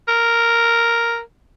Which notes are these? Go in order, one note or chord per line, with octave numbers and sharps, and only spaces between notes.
A#4